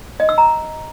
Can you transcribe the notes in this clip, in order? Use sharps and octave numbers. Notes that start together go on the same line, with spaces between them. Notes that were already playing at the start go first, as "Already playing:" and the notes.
D#5
E6
A#5